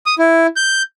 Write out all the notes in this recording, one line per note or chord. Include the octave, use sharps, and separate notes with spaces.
D#6
E4
G6